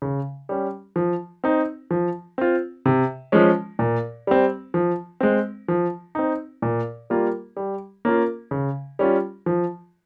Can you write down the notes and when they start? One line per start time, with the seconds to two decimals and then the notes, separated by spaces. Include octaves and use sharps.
0.02 C#3
0.49 G3 C#4
0.96 F3
1.44 C4 D#4
1.91 F3
2.38 C4 F4
2.86 C3
3.32 F3 G#3 C#4
3.79 A#2
4.27 G3 C4
4.74 F3
5.21 G#3 C4
5.68 F3
6.15 C4 D#4
6.62 A#2
7.10 G3 A#3 F4
7.57 G3
8.05 A#3 C#4 F4
8.51 C#3
8.99 G3 C#4 F4
9.46 F3